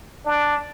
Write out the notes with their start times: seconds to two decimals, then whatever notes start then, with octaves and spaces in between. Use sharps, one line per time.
0.25 D4